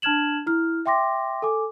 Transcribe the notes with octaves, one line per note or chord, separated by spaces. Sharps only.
D4 A5 F6 G#6 E7 F#7
E4 F6
E5 G5 C6 D6 A#6
A4 G#5 D6